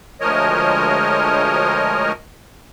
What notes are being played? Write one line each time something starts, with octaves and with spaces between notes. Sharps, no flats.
D2 F3 G#3 A#4 C#5 D#5